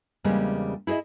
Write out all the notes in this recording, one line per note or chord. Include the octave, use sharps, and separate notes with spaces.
E2 C#3 G3 G#3 A#3 C4
E4 G#4 C#5 D#5 E5